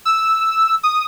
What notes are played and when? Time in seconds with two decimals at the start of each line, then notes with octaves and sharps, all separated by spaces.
0.05 E6
0.83 D#6